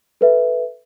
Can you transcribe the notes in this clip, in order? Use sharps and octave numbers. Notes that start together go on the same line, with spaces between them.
A4 B4 E5